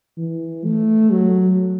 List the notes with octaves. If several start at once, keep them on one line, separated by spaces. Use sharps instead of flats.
E3
A3
F#3